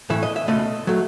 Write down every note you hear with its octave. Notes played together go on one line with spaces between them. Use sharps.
A2 E3 A3 E5
D#5
E5
C#2 B2 A3 D#5
F#3 A3